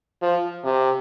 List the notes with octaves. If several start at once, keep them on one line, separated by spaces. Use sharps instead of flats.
F3
C3